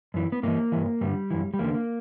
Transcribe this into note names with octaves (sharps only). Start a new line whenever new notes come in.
F#2 E3
B3
G2 E3 A#3
G2 E3
G2 D3 G3
F#2 E3
G3
E2 D3 A#3
A#3